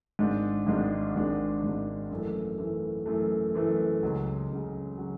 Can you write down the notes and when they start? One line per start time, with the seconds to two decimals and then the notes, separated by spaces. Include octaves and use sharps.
0.19 G#1 G#2 G#3 D4
0.66 G#1 G#2 G#3 D4
1.15 G#1 G#2 G#3 D4
1.63 G#1 G#2 G#3 D4
2.11 F#2 E3 A3
2.58 F#2 E3 A3
3.06 F#2 E3 A3
3.54 F#2 E3 A3
4.03 C#2 C#3 F#3
4.50 C#2 C#3 F#3
4.98 C#3 F#3